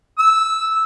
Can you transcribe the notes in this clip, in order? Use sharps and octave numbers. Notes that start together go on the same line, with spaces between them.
E6